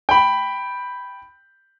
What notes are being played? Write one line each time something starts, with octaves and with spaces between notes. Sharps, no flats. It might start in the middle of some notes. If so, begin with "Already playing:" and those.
G5 B5